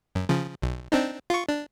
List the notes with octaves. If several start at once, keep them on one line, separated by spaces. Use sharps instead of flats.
F#2
C#3 F3
B1
C4 D4 D#4
F4 C#6
D4